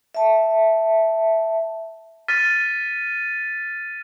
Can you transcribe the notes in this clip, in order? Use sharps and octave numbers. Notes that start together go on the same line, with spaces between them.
E5 A5
F6 A6 B6 D#7